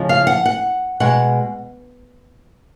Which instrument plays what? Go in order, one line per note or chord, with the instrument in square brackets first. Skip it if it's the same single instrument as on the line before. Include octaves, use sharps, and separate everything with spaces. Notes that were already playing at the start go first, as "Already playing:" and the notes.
Already playing: [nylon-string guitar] C#3 F3 G#3
F5
F#5
F#5
B2 G#3 F#5